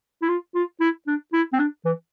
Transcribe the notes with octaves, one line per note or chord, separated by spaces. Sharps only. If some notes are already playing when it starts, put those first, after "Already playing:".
E4
F4
F4
E4
D4
E4
C4
D4
E3